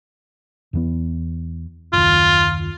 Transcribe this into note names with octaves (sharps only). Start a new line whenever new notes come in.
E2 E3 B3
F#1 D#2 F4